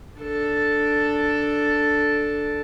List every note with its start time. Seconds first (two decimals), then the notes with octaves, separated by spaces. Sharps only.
0.19 D4 A4